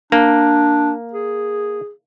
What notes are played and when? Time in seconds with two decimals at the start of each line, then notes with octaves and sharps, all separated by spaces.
0.12 A#3 D4
1.13 G#4